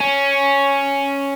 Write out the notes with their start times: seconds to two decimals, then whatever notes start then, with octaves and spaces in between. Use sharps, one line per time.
0.01 C#4